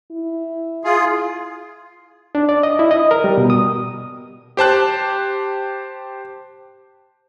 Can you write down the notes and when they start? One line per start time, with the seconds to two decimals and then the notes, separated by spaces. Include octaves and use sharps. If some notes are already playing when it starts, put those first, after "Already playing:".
0.11 E4
0.84 F4 G#4
2.35 D4
2.49 D5
2.63 D#5
2.79 E4
2.91 D#5
3.11 A#4
3.24 G3
3.38 B2
3.50 D#6
4.57 G4 C5 A5 F#6